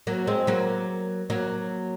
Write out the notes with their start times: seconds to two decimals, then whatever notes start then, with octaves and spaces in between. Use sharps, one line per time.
0.07 F#3 A#3
0.27 G#3 C4
0.47 F#3 A#3
1.30 F#3 A#3